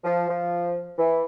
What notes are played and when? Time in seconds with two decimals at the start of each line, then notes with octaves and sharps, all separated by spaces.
0.04 F3
0.28 F3
0.99 E3